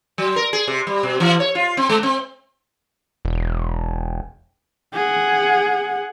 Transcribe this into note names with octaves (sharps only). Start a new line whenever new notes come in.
F#3
A#4
G#4
C3
G3
B2
E3
C#5
F4
C4
G#3
C4
E1
G#4 F#5